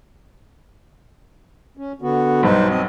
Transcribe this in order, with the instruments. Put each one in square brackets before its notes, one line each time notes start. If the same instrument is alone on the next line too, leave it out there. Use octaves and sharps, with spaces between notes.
[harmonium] C#4
D3 B3 F#4
[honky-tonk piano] B1 G2 [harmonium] D#4 B4 C5
[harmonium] C4 D#5